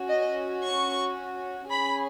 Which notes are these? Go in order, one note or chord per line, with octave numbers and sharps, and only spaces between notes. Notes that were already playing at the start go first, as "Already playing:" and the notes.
Already playing: C#4 F#4
D#5
C#6
C#4 G#4 B5